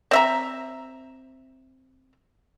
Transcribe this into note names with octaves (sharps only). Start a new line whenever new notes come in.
C4 E5 A#5